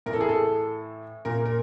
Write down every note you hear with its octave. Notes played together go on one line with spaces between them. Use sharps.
A2 E3 A#4
A4
G#4
A4
A#2 A#4
A#4